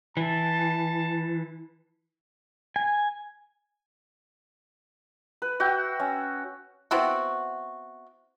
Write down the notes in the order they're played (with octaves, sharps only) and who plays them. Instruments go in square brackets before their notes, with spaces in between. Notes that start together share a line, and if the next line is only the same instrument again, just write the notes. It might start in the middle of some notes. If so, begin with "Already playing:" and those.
[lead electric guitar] E3 [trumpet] A5
[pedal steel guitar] G#5
[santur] B4
F#4 E5 G5
C#4 E5
[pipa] B3 C4 E4 F#4